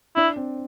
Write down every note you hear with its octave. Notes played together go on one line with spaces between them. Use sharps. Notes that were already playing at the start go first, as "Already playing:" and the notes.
D4 E4
C4